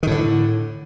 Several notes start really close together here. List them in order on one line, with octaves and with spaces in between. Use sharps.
D#3 A2 D3